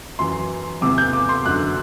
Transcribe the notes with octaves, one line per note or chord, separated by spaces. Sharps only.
F#2 E3 C6
E2 C3 E3 D6
G6
D6
C6
F#2 D3 F#6